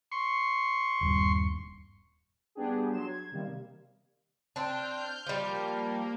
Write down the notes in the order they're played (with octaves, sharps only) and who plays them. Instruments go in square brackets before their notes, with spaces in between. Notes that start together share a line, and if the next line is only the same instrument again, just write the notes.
[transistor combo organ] C6 C#6
[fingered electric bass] D#1 G2
[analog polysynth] G3 B3 D4 G4 G#4
F#3 C6 E7
G#6
C3 D#3 G3 A#3
[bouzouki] C4 D4 [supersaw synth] F6 G6
[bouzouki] F3 G3 [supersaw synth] A#3